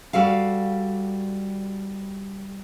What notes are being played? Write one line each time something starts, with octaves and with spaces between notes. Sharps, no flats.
G3 F#4 A4 F5